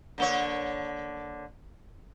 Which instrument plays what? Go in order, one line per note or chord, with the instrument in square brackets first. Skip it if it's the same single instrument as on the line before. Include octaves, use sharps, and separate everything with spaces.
[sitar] D3 A#3 C#5